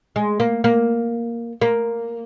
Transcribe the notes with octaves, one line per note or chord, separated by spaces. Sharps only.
G#3
A#3
A#3
A#3